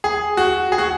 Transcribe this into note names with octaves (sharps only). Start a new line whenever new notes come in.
G#4
F#4
G#4
F#4